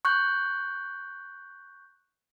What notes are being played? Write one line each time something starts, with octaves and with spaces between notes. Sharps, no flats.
C#6 F#6 G6